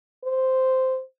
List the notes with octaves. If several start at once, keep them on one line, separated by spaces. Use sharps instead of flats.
C5